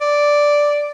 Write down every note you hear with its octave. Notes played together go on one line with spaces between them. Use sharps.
D5